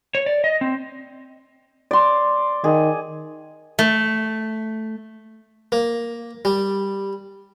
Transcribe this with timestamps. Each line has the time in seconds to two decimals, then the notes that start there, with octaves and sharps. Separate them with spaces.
0.15 C#5
0.26 D5
0.44 D#5
0.61 C4
1.91 D5 C6
2.64 D#3 G#4
3.79 A3
5.72 A#3
6.45 G3